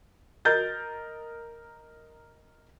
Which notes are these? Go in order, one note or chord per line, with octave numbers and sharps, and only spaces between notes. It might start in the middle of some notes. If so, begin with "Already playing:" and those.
A#4 D#5 G6 A6